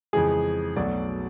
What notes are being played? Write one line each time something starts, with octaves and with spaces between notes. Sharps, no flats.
F2 C#3 E3 G#3 G#4
B1 B2 F#3 A3 D5